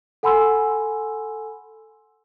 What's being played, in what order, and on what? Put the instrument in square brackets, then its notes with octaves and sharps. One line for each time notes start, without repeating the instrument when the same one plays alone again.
[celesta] A4 F#5 G#5 B5 C6 E6